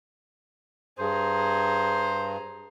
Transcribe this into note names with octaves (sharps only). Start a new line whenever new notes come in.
G2 G#4 C5 A#5